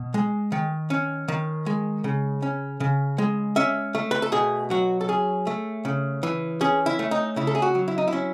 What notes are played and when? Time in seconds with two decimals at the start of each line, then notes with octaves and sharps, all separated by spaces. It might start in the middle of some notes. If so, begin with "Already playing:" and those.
Already playing: B2
0.14 G#3
0.52 D#3
0.90 C#4
1.28 D#3
1.66 G#3
2.04 C#3
2.42 C#4
2.80 C#3
3.18 G#3
3.56 C#4 E5
3.95 A3
4.11 B4
4.22 A4
4.32 B2 G#4
4.70 F#3 F#4
5.01 A4
5.08 C#4 G#4
5.47 A3
5.85 C#3
6.23 E3
6.61 C#4 G#4
6.86 E4
6.99 A3
7.11 D#4
7.36 C#3 E4
7.47 A4
7.55 G#4
7.62 F#4
7.75 F#3
7.88 E4
7.98 D#4
8.08 C#4 E4